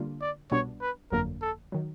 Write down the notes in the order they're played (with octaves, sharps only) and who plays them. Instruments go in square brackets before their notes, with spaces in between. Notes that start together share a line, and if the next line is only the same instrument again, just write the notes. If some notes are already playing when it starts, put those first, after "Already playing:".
Already playing: [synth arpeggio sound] D3 G3 A#3 D4 F4
[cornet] D5
[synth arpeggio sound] C2 B2 G3 B3 D4 [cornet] C#5
[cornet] B4
[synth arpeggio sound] G1 F2 D3 F#3 A#3 [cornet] A#4
[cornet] A4
[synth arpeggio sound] D#3 F#3